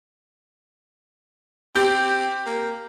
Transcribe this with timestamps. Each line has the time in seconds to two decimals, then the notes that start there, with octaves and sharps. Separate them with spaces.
1.75 C4 G4
2.46 A#3